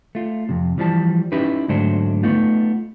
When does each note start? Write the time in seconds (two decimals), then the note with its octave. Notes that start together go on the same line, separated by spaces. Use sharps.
0.15 A3 F4
0.49 F2 C3
0.78 E3 F3 G3 A5
1.32 C#4 D#4 E4 G4 B4
1.68 D2 G#2 F#3 A3 D4 C5
2.23 A3 B3 D#4 F4